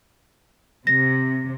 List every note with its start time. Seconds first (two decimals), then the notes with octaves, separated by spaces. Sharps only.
0.87 C3 A#6